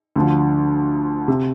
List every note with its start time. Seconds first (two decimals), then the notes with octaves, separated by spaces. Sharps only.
0.16 D2 D3 F3
1.28 C3